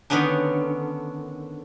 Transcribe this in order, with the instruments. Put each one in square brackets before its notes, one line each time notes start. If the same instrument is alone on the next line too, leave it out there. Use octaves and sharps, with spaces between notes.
[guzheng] D3 D#3 B3 C#4 D4